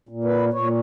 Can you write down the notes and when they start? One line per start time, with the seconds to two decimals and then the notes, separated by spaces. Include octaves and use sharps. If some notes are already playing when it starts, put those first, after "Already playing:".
0.09 A#2
0.24 B4
0.53 A#2 C#5